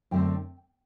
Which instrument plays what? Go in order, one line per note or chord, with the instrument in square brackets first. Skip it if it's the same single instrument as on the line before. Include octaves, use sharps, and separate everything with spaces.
[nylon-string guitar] F#2 D3 A3 C4 G5